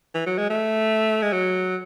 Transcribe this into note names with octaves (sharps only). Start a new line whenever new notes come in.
E3
F#3
G#3
A3
G#3
F#3